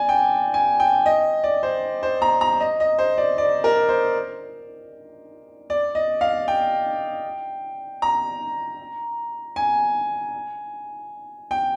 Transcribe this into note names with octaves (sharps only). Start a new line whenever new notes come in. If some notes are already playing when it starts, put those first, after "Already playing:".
Already playing: D5 G#5
G5
G#5
G5
D#5
D5
C5
C5
A#5
A#5
D#5
D#5
C5
D5
D5
A#4
C5
D5
D#5
F5
G5
A#5
G#5
G5